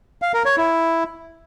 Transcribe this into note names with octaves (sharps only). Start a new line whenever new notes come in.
F5
A#4
C#5
E4